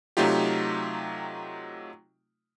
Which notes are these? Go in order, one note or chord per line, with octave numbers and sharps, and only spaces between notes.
C3 F#3 A3 D#4 F4 G4